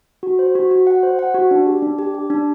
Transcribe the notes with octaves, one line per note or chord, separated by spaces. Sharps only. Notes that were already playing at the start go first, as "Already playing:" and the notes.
F#4
C5
F#4
F#4
F#5
C5
F#5
F#4
D4
G4
D4
G4
G4
D4